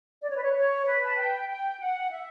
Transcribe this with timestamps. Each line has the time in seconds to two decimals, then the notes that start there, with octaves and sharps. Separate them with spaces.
0.21 D5
0.29 C#5
0.36 B4
0.43 C#5
0.53 C#5
0.85 B4
1.06 A5
1.17 G5
1.48 G5
1.80 F#5
2.11 E5